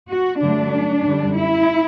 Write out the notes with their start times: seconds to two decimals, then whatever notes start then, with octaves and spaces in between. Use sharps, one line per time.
0.09 F#4
0.40 G2 D3 F#3 A3 D4
1.03 F#2 D3 G3
1.36 E4